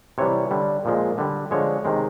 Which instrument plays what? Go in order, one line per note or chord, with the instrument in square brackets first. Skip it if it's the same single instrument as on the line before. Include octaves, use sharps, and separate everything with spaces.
[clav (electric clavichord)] C3 E3 G3 C#5
D3 G3
A#2 F3 G#3
D3 G3
D3 F3 G#3 C#5
C3 D#3 G#3